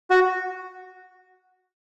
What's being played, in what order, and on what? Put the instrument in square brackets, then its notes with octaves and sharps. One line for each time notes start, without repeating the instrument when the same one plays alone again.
[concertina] F#4